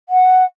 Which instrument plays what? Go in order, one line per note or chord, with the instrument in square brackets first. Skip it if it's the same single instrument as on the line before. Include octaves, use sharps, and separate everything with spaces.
[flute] F#5